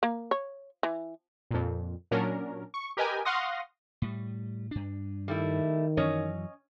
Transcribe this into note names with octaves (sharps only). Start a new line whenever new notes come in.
A#3
C#5
E3
F2 A#2
A#2 F#3 C#4 D4 A#4
C#6
G4 A#4 B4 D#5 G5 G#5
F5 F#5 C6 C#6 D#6 A#6
A2 G3
G2 D4
D#3 G3 A3 E4
F#2 E3 F#3 C#4 C#5 D#5